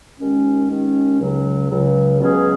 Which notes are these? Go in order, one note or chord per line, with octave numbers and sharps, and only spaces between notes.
D#2 D#3 G#3 C#4
D#2 D#3 G#3 C#4
C#2 C#3 F#3
C#2 C#3 F#3
C#2 B2 F#3 C#4 G#4